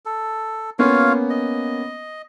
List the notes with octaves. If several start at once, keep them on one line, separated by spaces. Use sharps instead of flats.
A4
A#3 B3 C#4 F4 C#5 F5
D#5